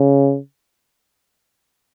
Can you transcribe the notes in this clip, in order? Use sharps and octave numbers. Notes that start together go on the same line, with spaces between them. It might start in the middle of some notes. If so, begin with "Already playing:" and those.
Already playing: C#3